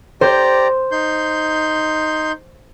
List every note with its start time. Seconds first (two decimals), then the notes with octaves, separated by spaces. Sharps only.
0.21 G4 C5 D5 A#5
0.91 D#4 C6 G6